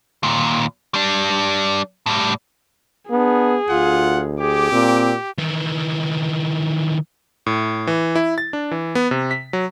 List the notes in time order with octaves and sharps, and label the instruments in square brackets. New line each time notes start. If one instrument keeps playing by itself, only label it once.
[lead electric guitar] D#2 A#2
G3 D4
A2 G3
[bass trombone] B3 [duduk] D4 [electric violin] G#4
[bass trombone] D2 [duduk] F4 [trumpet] F#5
[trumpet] G4 [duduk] G#4 [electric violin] D6
[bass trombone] A#2 [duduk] C4
[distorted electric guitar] D#3 E3
[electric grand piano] A2
E3
E4
A6
D4
E3
B3
C3
B6
F#3